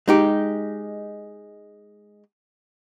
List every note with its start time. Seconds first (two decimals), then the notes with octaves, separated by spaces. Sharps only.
0.08 G#3 D#4 G4